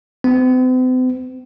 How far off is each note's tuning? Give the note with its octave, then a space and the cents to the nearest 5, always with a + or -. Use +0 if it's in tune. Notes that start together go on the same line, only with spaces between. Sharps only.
C4 -45